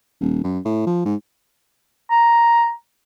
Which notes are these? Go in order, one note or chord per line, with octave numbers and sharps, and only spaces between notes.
D#1
F#2
A2
F3
G#2
A#5